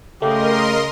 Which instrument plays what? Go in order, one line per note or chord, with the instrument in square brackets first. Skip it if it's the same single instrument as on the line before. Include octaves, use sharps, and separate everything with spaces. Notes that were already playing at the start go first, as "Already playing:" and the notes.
[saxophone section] C#3 [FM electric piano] A3 [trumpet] G4 [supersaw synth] A#4 D#5 C6